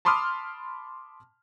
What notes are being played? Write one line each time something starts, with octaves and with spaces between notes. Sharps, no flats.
A5 B5 C6 D6 D#6 F6